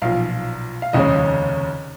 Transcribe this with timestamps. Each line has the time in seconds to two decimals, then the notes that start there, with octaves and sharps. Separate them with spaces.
0.02 B1 A#2 F3 F5
0.82 F5
0.93 F1 D#2 C#3 G#3 C#4 D#5